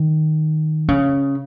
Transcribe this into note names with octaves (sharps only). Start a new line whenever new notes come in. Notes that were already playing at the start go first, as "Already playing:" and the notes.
Already playing: D#3
C#3